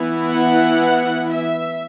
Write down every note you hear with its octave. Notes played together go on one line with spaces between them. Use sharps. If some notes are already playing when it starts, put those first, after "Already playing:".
Already playing: E3 B3 E4
F#5
E5